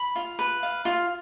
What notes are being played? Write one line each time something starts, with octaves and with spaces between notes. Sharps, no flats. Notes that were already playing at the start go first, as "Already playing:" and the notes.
Already playing: B5
F4
B4
F5
F4